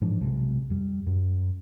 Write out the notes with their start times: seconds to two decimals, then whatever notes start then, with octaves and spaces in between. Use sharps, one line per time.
0.01 G#2 E3 F3 D4
0.21 B1 C3 G#3
0.70 F2 G3
1.06 F#2